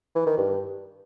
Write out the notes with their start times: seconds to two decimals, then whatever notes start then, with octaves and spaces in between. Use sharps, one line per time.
0.15 E3
0.26 D#3
0.38 G2